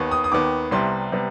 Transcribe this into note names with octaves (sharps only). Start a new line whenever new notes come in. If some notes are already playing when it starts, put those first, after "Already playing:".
Already playing: D#2 D#3 B3
D#6
D#6
D#2 D#3 B3 D6
C2 C3 G3 B3 C6
C3 G3 B3